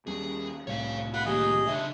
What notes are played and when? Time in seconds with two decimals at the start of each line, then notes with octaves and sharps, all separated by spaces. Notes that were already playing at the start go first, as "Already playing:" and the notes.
0.07 D#2 G3 C#4 G#4
0.67 C2 A2 G3 C#5 F5
1.14 G4 F5 F#5 B5
1.26 D#3 A#3 G4 G#4 D#5
1.67 C#3 D4 E5